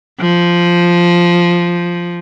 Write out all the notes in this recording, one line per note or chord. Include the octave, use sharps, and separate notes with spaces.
F3